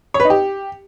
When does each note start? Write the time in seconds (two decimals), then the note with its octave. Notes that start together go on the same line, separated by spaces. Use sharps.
0.14 C#5
0.20 B4
0.25 D#4
0.30 G4